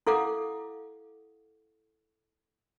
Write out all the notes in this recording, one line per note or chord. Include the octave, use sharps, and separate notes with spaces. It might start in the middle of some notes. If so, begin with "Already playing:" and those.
E4 A4 F5 F#5 D6